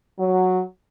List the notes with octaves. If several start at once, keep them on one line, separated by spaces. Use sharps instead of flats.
F#3